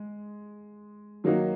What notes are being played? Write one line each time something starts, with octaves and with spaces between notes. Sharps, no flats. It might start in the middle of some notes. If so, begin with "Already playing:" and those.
Already playing: G#3
D#3 F#3 A#3 D#4 F#4